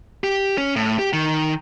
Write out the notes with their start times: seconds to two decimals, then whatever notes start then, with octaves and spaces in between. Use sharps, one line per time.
0.24 G4
0.58 C#4
0.76 A2
0.99 G4
1.13 D#3